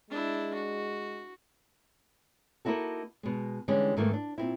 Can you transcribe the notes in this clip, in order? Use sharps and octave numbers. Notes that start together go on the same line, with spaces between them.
G#3 D4 E4
F#4
A#3 D#4 E4 F#4 A4
B2 G#3
D3 E3 G3 G#3 C#4
G#2 D#3 E3 A3 A#3
D4
A#2 C4 E4